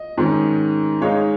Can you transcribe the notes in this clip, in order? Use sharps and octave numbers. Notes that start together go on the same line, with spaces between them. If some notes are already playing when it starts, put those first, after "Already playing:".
Already playing: D#5
G#2 D#3 C#4
G#2 G#3 D#4 C#5 F5